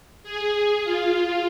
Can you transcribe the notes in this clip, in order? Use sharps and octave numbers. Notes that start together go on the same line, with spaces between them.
G#4
F4